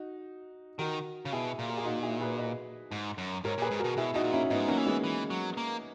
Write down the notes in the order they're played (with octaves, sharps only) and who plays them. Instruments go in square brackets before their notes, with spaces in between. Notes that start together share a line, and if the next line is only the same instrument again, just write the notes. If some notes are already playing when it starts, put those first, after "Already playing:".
Already playing: [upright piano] D#4 F#4
[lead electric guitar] D#3 [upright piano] F#4 A#4
[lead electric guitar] C#3
[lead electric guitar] B2 [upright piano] E4 G#4
[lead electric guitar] A#2
[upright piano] A#4
G#4
D#4 F#4
F#4
E4 G#4
G#4 B4
B4 D#5
[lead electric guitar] G#2
F#2
[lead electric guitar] G#2 [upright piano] A#4 C#5
[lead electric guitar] A#2 [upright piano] G#4 B4
[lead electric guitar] G#2
[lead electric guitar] B2 [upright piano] F#4 A#4
[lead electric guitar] B2 [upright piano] E4 G#4
[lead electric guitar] B2 [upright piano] D#4 F#4
[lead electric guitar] A#2
[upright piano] C#4 E4
[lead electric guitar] G#2 [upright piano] B3 D#4
[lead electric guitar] G#3
[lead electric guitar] F#3 [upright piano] A#3 C#4
[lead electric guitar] E3
[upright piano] G#3 B3
[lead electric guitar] E3
F#3
A#3